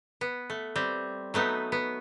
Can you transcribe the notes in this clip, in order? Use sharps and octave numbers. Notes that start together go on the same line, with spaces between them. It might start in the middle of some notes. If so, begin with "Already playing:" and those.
B3
A3
G3 C4
F#3 A3 B3 D#4
B3